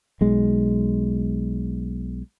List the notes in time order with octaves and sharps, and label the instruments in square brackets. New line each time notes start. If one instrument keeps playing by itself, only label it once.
[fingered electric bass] B1 G#3